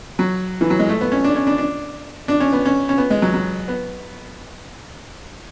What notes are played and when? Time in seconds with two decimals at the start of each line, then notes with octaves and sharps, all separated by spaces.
0.19 F#3
0.61 E3
0.70 F#3
0.79 G#3
0.89 A3
1.01 B3
1.12 C#4
1.24 D4
1.36 C#4
1.47 D4
1.58 D4
2.28 D4
2.40 C#4
2.53 B3
2.65 C#4
2.89 C#4
2.98 B3
3.10 G#3
3.22 F#3
3.34 F#3
3.68 B3